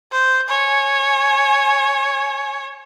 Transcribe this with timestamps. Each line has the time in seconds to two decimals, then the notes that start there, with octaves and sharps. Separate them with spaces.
0.12 C5
0.49 C#5 G#5